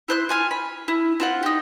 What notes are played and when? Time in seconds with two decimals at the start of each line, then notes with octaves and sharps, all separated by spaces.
0.08 E4 C5 F#6
0.29 F4 G#5 F6
0.51 B5
0.88 E4
1.20 C4 F4 F#5
1.43 D#4 G4